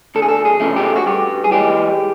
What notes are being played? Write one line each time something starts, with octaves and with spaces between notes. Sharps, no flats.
D2 A4
G#4
A4
G#4
C#3 F3 A3
G4
F#4
G2 G4
G#4
E3 G#3 G4